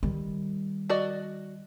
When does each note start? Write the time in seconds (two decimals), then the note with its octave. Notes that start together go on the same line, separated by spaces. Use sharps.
0.03 D#3 G3
0.89 F#4 D5 D#5